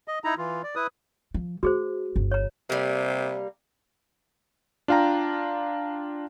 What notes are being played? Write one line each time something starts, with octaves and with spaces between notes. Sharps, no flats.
D#5
D#4 E4 A#5
E3 F4
D5
E4 B4 D#6
F3
A3 F#4 G#4 C5
G1 E2
C#5 A#5
C3 G3 A#3
D4 F4 F5 G5 A#5